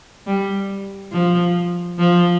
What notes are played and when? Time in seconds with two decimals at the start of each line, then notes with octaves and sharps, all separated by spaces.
0.27 G3
1.12 F3
1.99 F3